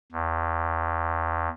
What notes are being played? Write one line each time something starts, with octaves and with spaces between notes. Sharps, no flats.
E2